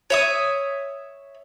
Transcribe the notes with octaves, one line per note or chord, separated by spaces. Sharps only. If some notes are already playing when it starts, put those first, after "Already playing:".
C#5 E5 D#6